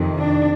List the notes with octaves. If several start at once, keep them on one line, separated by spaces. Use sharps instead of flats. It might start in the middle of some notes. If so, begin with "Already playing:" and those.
Already playing: F2 C3 D#3
D4